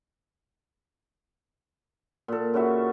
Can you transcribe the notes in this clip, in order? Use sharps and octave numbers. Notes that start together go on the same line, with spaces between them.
A#2 A4
C#3 E4 F#4 E5